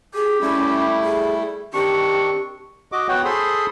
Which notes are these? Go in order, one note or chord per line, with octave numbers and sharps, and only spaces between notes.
G4 G#4
G3 A3 C#4 E4
G#4
D#3 C4 D4 G4 C#6
F#4 D#5 D6
B3 F#4 C#5 F#5 G5
G#4 A4 C5 B5 C6 D#6